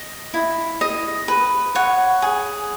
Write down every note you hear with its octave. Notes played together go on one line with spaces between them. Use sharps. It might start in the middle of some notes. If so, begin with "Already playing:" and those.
Already playing: D#5
E4
D#5
B4
C#5 F#5
G#4